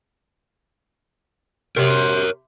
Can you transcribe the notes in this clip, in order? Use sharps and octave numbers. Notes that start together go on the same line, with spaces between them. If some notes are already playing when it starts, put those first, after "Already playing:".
C3 A#4 C#5